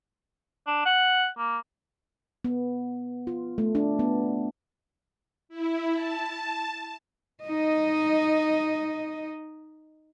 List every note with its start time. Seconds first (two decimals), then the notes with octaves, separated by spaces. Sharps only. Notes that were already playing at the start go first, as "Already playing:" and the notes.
0.67 D4
0.85 F#5
1.38 A#3
2.44 B3
3.27 F4
3.58 A3
3.75 D4
3.99 B3
5.49 E4
5.93 A5
7.44 D#4 D#5